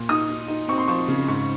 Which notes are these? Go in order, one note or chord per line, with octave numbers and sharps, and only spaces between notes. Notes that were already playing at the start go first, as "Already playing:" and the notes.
Already playing: A#2
D#4 D#6
D#4
D#4
C4 C#6
C6
F3 C#6
C#3
G#2 C#6